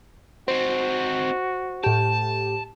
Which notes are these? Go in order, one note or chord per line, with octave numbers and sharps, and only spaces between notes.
C4 D#4 F#4 C5
A2 G4 A5